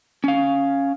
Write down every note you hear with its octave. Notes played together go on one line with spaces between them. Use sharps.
C#4 F5